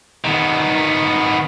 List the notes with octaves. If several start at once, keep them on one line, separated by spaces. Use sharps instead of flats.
D#3 B3